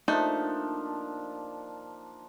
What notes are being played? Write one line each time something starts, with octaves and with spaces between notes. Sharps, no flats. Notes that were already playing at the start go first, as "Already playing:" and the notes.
F3 A3 A#3 D4 D#4